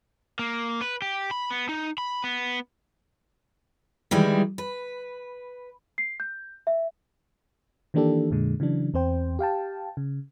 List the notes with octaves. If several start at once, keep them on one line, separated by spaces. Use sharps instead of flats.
A#3
B4
G4
B5
B3
D#4
B5
B3
D#3 E3 G3 G#3
B4
C7
G6
E5
D#3 E3 A#3 D4 G4 A4
F2 A#2 D3 G#3
C#3 E3 F#3 D4
E2 C4 C5 G5
G4 F5 G5 A5
C#3